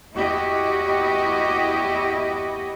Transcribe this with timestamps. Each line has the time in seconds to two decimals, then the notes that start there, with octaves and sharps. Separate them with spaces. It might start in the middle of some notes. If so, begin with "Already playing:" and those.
0.13 E2 E4 F#4 G4 D#5